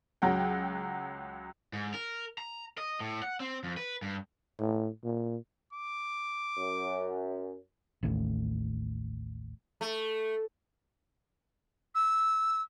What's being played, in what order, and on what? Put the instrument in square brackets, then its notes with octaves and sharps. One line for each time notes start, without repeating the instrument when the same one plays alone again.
[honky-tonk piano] C#2 F#3 F#5 G5
[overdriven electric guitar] G#2
A#4
A#5
D#5
A2
F#5
C4
F2
B4
G2
[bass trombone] A2
A#2
[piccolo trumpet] D6
[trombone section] F#2
[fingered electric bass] A1 D#2 A2
[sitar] A3
[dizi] E6